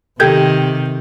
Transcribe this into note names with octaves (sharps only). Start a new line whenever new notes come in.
C3 D#3 G4 A4 G6 G#6